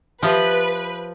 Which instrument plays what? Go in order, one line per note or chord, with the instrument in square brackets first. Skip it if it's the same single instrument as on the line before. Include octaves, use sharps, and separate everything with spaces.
[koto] F3 [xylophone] G4 E5 D#6 [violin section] B4